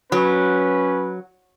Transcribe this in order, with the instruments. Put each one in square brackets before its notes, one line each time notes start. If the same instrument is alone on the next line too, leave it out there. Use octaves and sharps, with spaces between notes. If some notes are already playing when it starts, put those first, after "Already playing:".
[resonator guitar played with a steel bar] F#3 [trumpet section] C#4 B4